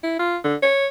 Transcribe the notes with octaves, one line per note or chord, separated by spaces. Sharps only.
E4
F4
D3
C#5